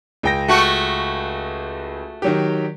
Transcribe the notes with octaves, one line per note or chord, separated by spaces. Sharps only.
C#2 G5 A#6
A3 F#4
D#3 F#3 G4